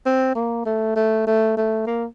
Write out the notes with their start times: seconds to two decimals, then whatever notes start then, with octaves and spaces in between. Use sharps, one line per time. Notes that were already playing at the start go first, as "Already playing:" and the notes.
0.06 C4
0.35 A#3
0.66 A3
0.96 A3
1.27 A3
1.57 A3
1.87 A#3